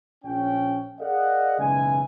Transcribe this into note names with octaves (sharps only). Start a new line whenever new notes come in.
A#1 C#4 G5
G#4 A#4 D5 D#5 F5 F#5
F#1 B1 C#3 E3 G#3 G#5